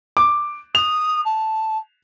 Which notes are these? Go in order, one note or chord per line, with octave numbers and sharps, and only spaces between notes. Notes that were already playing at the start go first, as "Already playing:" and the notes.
D6
D#6 F7
A5